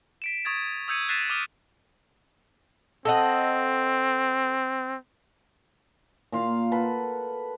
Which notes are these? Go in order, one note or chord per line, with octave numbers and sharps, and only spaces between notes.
B6 D7 E7
C#6 D#6 G#6 A6
D#6 E6 G6 G#6 C#7 D#7
F#6 A6 B6 C7 D#7 E7
D6 D#6 F6 D#7
C4 A4 D#5 F#5
A#2 F4 F5
A4 B4 F#5